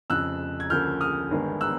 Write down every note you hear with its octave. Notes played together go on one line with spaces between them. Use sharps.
F1 F2 C#3 F3 E6 F#6
G#6
D2 C#3 F3 A#3 C#4 F6 G6
D#6 F6
G1 G2 D#3 G#3 B3
E6 F#6